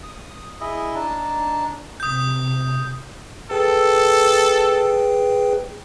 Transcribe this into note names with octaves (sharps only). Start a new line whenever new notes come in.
D#6
E4 G#4 D#5 E5
D4 D#4 A5
C3 D#6 G6
G#4 A4 B4 G5